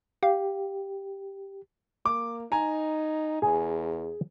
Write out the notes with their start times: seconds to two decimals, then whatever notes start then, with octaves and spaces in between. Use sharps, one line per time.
0.23 G4 F5
2.06 A#3 D6
2.52 D#4 G#5 A#5
3.42 E2 G#4